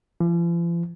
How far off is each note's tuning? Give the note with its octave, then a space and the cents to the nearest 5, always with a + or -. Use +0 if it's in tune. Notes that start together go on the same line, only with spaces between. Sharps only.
F3 -45